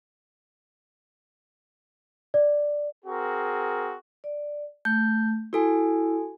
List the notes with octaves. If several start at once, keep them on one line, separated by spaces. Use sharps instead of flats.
D5
C4 F#4 G#4 A#4
D5
A3 G6
E4 F#4 A4 G#5